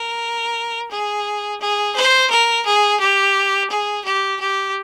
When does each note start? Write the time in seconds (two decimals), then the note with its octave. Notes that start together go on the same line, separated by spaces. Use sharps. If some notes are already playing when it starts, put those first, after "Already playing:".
Already playing: A#4
0.91 G#4
1.61 G#4
1.96 C5
2.30 A#4
2.66 G#4
3.00 G4
3.70 G#4
4.04 G4
4.40 G4